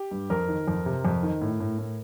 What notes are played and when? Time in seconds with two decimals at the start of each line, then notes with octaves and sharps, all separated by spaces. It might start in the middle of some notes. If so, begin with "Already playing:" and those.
Already playing: G4
0.11 G2
0.30 F2 A#4
0.48 D#3
0.68 F2
0.86 C3
1.05 F2
1.23 D#3
1.41 A2
1.60 A2
1.79 A2